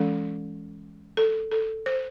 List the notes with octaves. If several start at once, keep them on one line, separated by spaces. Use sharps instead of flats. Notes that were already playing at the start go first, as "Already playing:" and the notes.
Already playing: E3 G#3 C#4 A4
A4
A4
C5